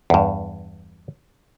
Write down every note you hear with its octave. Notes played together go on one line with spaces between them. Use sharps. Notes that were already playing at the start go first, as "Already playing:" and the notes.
E2 G2